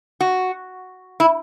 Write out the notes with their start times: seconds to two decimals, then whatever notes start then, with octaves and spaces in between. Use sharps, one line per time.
0.20 F#4
1.20 E4